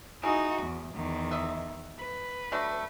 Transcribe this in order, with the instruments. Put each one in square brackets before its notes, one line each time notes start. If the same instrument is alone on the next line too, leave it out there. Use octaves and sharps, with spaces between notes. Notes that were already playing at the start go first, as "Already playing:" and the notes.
[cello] D#4 F#4 [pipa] E4 G#4
[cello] E2
E2 D#3
[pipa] D#5 E5
[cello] B4
[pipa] F#3 A3 D4